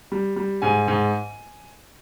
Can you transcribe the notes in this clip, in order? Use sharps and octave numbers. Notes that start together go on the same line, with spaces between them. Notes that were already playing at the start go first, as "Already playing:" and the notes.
G3
G3
G#2 G#5
G#2